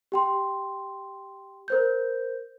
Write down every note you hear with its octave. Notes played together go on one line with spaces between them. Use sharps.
G4 G5 C6
A#4 C5 G6